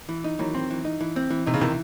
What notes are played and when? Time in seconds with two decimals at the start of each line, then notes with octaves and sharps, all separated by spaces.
0.09 E3
0.24 D#4
0.39 D#3 E3 F#3
0.55 C4
0.70 E3
0.85 D#4
1.01 E3
1.16 C4
1.30 E3
1.46 C3 D#4
1.54 C#3
1.61 C3 D#3 E3